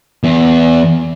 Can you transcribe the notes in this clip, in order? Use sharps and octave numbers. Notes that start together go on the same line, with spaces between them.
E2